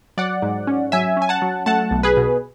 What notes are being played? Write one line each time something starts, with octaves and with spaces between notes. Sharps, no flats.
F#3 D5 F#5
G#2
C#4
F#3 E5 G#5
C#4
G#5
F#5 A5
F#3
A3 F#5 A5
B1
G#4 B4
B2